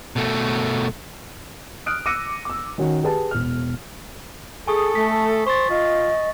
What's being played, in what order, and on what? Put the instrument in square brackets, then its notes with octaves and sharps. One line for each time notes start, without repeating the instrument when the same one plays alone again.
[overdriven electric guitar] B2 A3
[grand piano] D#6 F6 F#6 D7
D6 E6 F#6 A#6 C#7 D#7
D6 E6
D#3 C#4 F#4
G4 G#4 B4 A5
E1 F6
[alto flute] G#4 [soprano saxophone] A4 [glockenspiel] G#5 C#6 D#6
[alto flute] A3 [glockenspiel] B6
[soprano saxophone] C5 [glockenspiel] C#6 A6
[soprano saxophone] F4 [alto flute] D#5